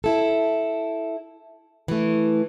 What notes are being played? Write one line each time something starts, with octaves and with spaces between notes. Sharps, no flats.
E4 A4
E3 A3